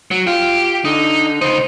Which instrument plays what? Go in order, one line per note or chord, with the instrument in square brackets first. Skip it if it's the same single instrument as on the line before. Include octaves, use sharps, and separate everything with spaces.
[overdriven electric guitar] F#3
[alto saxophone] F4 [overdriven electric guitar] G4
[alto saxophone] D3 [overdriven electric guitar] D#4
[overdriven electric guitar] C#2 D#4 [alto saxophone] C5